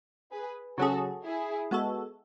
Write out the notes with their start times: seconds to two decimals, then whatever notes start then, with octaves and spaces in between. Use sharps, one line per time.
0.31 G#4 B4
0.78 C#3 F#3 C#4 F#4 G#4 A4
1.25 E4 G#4
1.71 G#3 B3 F#4 A4